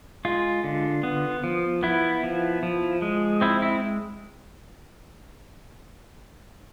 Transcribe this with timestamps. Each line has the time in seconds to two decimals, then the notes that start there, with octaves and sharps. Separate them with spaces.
0.25 G#3 F4
0.64 D3
1.03 B3
1.44 F3
1.83 B3 E4
2.23 F3
2.63 F3
3.02 G#3
3.41 C4 E4
3.62 E4